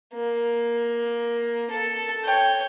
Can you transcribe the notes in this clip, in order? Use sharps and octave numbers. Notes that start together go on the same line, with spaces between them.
A#3
A4
C#5 G5